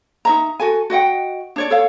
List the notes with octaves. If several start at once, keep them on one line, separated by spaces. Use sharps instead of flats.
D#4 E5 A#5
F#4 A4 G#5
F#4 D#5 F#5 G5
D4 C#5 D5
A4 C#5 F5